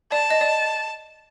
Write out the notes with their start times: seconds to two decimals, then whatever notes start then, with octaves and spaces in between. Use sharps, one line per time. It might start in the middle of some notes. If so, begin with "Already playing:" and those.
0.12 D5 A5
0.31 D#5
0.41 D5